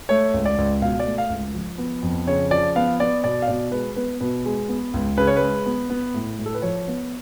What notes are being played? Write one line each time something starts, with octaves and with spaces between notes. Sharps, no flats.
A3 C#5
C#2
D5
C#2
B2 F5
D5
A3
F5
C#2
F3
B3
F2
C#3 C#5
F3 D5
B3 F5
B3 D5
B2 D5
F5
B2 D5
G#3 B4
B3 B4
B2 B4
G#3
B3
C#2
C#3 B4
C#5
G#3 B4
B3
B3
A2
A2
A4
B4
F3 C#5
B3